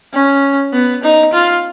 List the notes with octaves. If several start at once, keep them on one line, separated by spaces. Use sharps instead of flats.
C#4
B3
D#4
F4